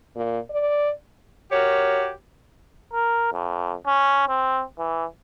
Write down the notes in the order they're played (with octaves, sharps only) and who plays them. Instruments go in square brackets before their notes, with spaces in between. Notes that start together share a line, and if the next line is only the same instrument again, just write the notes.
[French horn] A#2
D5
[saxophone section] F#4 G4 A#4 C#5
[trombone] A#4
F2
C#4
C4
E3